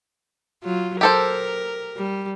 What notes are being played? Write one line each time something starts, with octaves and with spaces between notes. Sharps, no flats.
F#3 F4
G4 A4 A#4 C5
G3